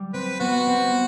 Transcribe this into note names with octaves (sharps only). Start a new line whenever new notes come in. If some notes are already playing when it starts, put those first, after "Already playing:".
Already playing: G3
C4 B4
B3 F#4
C4